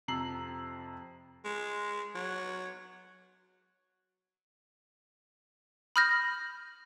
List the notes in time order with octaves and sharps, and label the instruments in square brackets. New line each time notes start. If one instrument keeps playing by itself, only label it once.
[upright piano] F2 C3 A#5 E6 C7 F#7
[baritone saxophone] G#3
F#3
[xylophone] B5 D#6 F6 G6 A#6